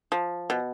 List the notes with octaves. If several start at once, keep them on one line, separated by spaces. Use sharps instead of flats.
F3
B2